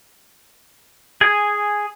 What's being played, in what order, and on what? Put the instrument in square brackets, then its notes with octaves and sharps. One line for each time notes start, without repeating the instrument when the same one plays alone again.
[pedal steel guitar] G#4 G#5